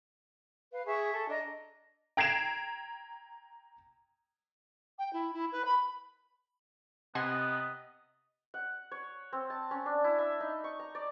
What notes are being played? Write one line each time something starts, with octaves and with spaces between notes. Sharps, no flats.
B4 F5
G#4 E5 C#6
A4
D4 D#5 A#5
G5 A#5 G#6 C7 D7 E7
G5
E4
E4
B4
B5
C3 B3 D#5 F#5 G#5 C6
F#5
C#5
C4
A5
C#4
D4
E4
E5
D#4
C#6
A#5
D5